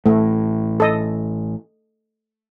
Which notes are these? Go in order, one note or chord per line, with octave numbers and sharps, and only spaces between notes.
A1 A2 A3
A4 D#5